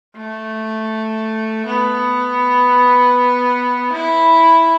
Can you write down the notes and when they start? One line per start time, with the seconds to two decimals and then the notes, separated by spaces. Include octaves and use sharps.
0.16 A3
1.67 B3
3.93 E4